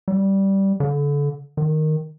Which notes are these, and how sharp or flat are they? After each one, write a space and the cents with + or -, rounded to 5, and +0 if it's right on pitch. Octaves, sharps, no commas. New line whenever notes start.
G3 -10
D3 -30
D#3 -5